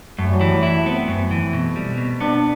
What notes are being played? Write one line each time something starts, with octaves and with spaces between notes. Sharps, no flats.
F#2 A3
G3
F#3
E3 G3
A3
E4
B3 C4
F#2
E3
B2
G3
B2
B3 D4